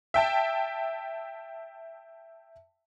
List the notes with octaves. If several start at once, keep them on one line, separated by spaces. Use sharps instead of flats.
E5 G5 A5